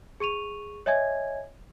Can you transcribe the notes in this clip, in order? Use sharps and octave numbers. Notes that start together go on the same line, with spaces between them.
G#4 C#6 D#7 F7
C#5 D#5 E5 G#5 G#6